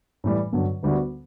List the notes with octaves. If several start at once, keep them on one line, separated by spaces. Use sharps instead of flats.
A2 E3 G3
G2 D3 F#3
D2 D3 G3 B3 F#4